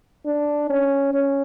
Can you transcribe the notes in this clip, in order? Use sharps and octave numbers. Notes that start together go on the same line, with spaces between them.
D4
C#4
C#4